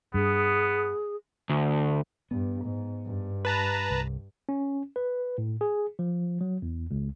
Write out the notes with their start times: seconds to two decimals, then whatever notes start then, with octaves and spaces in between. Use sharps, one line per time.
0.14 G2 B3 G#4
1.50 D2
2.31 G2 B3
2.65 G#2
3.05 G2
3.45 B4 A5 A#5
3.90 C2
4.49 C#4
4.96 B4
5.38 A2
5.61 G#4
5.99 F3
6.41 F#3
6.62 E2
6.91 C#2